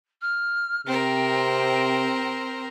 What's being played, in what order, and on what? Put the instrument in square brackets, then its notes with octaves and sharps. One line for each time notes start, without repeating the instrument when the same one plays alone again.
[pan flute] F6
[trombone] C3 [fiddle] C4 A#4 [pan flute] G5